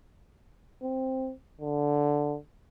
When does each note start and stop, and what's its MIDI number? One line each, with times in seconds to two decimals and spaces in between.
0.83 1.32 60
1.61 2.37 50